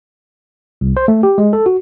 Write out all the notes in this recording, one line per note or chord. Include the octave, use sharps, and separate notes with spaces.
C2
C5
A3
G4
G#3
A4
F#4